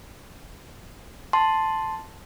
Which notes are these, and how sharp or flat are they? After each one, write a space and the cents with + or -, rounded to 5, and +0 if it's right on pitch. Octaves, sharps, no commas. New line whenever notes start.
A5 +0 C6 +0